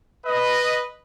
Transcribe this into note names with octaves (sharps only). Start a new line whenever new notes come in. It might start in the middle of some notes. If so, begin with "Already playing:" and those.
B4 D#5